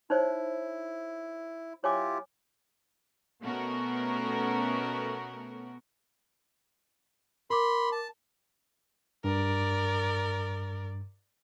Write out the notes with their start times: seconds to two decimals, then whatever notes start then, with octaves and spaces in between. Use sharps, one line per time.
0.10 D#4 E4 C5 C#5
1.84 E4 F4 G4 C#5 G#5 D6
3.41 B2 A3 B3 C#4 F#4 A#4
7.50 A#4 B5 C6 D6
7.92 A5
9.24 G2 A#4 D5